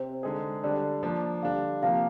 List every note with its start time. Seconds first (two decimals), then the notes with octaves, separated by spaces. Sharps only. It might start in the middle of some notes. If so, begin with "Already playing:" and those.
Already playing: C3 C5
0.23 D3 G#3 D#4 G#4
0.64 D3 G3 D4 D5
1.03 F3 A#3 D4
1.43 D3 G3 D4 F5
1.82 C3 F3 A#3 F5